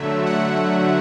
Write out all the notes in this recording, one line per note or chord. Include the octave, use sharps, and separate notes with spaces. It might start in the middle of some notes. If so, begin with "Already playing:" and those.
Already playing: D3 F#3 A3 E5
F#5